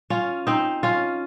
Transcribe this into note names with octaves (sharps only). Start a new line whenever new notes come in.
C#4 F4
C4 D#4
C#4 F4